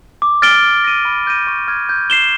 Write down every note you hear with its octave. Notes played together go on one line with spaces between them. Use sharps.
D6
F6 A6 D7 G7
F6
A#6 D#7
B5
D6 G6 A#6 D#7
C#6
F6 G#6
G6
C7 E7 G7